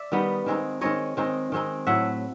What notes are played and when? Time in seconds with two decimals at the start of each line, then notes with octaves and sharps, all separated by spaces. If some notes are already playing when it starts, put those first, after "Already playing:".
Already playing: D5 E5
0.12 D#3 G3 B3 D#4
0.46 D#3 G#3 C4 D#4
0.81 D#3 G#3 C4 D#4 C#5 D#5
1.17 D#3 G#3 C4 D#4
1.52 D#3 G#3 C4 D#4
1.87 A2 F#3 A3 E5 F#5